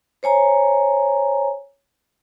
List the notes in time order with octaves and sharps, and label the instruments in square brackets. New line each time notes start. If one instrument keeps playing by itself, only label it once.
[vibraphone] C5 C#5 G#5 A#5